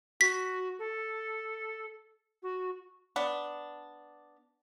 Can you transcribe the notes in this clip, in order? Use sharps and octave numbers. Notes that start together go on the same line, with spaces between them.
F#4 B6
A4
F#4
B3 D4